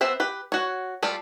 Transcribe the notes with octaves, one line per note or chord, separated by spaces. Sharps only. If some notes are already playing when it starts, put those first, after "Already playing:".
B3 C4 C5 E5
G4 B4
F#4 C#5
G3 A3 F4 G4